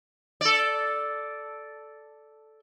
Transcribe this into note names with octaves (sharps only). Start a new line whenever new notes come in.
A4 D5